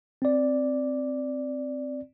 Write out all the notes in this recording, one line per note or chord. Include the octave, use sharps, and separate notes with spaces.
C4 D5